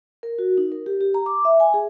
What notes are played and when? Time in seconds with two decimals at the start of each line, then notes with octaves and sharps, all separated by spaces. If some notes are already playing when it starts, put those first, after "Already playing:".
0.23 A#4
0.39 F#4
0.58 D#4
0.72 A#4
0.86 G4
1.01 G4
1.14 A#5
1.26 D6
1.45 E5
1.60 G#5
1.74 G#4